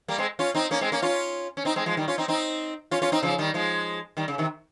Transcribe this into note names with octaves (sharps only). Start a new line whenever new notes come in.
G3 A#3
G#3 C4
C#4 F4
C4 D#4
A#3 C#4
G#3 C4
A#3 C#4
C#4 F4
C#4
C4 D#4
G#3 C4
F3 G#3
D#3 G3
C#4 F4
C4 D#4
C4 D#4
C#4 F4
C#4 F4
C4 D#4
C#3 F3
D#3 G3
F3 G#3
D#3 G3
C#3
C3 D#3